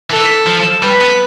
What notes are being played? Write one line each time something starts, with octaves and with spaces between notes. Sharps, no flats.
E3 A4
F3
G3 B4
B3